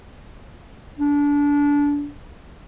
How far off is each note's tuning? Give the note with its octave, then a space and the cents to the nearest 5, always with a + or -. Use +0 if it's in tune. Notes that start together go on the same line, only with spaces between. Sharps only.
D4 -25